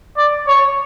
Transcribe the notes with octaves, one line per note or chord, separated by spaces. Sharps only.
D5
C#5